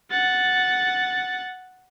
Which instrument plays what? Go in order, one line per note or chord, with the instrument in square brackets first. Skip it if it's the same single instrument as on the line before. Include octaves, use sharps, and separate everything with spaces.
[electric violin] F#5 A6